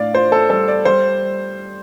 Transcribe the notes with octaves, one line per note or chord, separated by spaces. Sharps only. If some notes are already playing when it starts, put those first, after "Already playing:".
Already playing: A2 D4 D5 F5
F4 C5
A4
G3 A4
D5
G3 C5